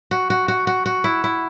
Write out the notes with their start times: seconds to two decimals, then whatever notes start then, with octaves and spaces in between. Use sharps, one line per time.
0.11 F#4
0.30 F#4
0.48 F#4
0.67 F#4
0.86 F#4
1.04 E4
1.24 E4